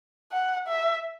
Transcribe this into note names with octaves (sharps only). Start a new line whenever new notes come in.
F#5
E5